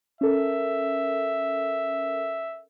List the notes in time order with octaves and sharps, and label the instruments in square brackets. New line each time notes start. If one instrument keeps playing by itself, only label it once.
[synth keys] C#4 A4 A#4 [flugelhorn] E5